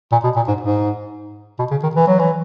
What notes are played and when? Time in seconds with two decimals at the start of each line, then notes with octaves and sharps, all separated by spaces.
0.12 A#2
0.24 B2
0.36 A#2
0.48 G#2
0.61 G#2
1.59 B2
1.71 C#3
1.83 D#3
1.95 E3
2.07 F#3
2.19 E3